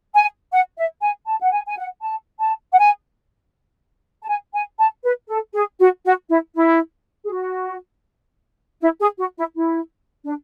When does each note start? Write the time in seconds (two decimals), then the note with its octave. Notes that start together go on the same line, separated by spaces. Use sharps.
0.14 G#5
0.52 F#5
0.77 E5
1.02 G#5
1.27 A5
1.41 F#5
1.52 G#5
1.66 G#5
1.77 F#5
2.02 A5
2.40 A5
2.72 F#5
2.78 G#5
4.23 A5
4.29 G#5
4.54 G#5
4.79 A5
5.04 B4
5.29 A4
5.54 G#4
5.79 F#4
6.04 F#4
6.29 E4
6.55 E4
7.23 G#4
7.31 F#4
8.81 E4
9.00 G#4
9.18 F#4
9.37 E4
9.56 E4
10.24 D4